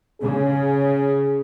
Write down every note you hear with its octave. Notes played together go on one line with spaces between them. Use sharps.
C#3 G#4